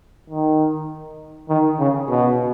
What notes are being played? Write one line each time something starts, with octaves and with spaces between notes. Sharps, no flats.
D#3
D#3
C#3
B2